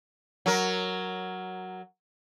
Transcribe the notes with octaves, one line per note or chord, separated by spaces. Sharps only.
F#3 A#4